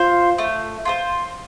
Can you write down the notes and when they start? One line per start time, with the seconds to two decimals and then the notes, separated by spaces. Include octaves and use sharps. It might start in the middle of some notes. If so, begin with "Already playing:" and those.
Already playing: F4 C5 F5
0.38 A3
0.85 F4 A4 C5